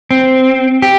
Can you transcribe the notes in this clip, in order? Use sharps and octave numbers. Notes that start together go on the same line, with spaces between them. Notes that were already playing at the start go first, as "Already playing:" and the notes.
C4
G4